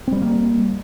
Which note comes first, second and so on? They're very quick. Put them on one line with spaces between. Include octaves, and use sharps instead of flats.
C4 G3 A3 A#3